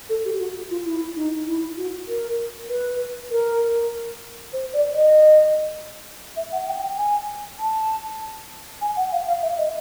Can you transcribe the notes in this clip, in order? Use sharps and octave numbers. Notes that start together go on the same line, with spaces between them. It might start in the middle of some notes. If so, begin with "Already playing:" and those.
A4
G4
F#4
F4
E4
D#4
E4
F#4
A#4
B4
A#4
C5
D5
D#5
E5
F#5
G5
G5
G#5
A5
G#5
F#5
F5
F5
E5
D#5